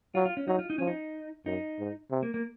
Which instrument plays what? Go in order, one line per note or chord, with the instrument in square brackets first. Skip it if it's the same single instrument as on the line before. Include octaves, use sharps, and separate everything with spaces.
[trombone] F#3 [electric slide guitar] F4
[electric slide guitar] F4
C#4
[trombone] F#3 [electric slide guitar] D#4
[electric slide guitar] F4
D#4
[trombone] F3 [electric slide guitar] C#4
[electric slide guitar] D#4
[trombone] F#2 [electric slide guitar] D#4
[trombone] G#2
C3
[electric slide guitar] A#3
A#3